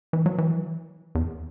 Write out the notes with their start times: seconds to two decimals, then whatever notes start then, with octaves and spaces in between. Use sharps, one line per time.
0.13 E3
0.26 F#3
0.38 E3
1.15 E2